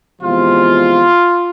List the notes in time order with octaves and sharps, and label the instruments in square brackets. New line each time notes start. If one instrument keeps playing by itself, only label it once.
[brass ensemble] E2 C3 F3 G#3 F4